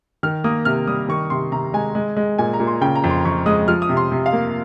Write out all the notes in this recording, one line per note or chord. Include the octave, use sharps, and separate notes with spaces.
D#3 F6
A#3 D#6
C3 F6
G3 D#6
D#3 C#6
C3 C6
C3 A#5
G#3 G#5
G#3
G#3
A#2 G#5
A#5
A#2
C6
C#3 G5
A#5
F2
C6
F2 C#6
G#3 D#6
F3 F6
D#6
C3
C6
C3
F5
A#3